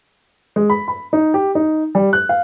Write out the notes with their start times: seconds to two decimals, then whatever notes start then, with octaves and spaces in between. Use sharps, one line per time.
0.56 G#3
0.70 B5
0.88 B5
1.13 D#4
1.34 G4
1.55 D#4
1.95 G3
2.13 F#6
2.29 F5